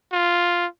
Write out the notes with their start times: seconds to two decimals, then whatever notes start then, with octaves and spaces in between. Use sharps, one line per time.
0.12 F4